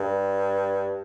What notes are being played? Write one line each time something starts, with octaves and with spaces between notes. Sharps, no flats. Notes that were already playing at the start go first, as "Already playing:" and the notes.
Already playing: G2